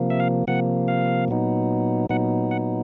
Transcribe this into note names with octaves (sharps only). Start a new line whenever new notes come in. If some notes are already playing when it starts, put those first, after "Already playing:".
Already playing: C3 F3 A#3
E5
F5
C3 F3 A#3 F#5
F5
A#2 F#3 B3 D#4
A#2 F#3 B3 D#4 F#5
F#5